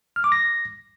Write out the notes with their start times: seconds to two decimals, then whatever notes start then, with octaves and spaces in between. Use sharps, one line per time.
0.16 F6
0.24 D6
0.32 A#6